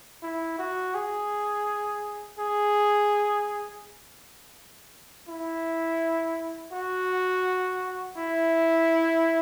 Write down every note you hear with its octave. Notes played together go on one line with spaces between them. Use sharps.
E4
F#4
G#4
G#4
E4
F#4
E4